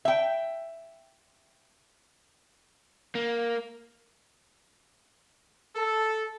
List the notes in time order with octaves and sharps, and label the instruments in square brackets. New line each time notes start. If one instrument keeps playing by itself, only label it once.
[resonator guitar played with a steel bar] E5 G5
[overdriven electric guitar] A#3
[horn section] A4